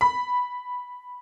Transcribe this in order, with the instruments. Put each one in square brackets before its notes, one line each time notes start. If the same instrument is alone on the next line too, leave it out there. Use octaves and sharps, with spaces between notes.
[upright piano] B5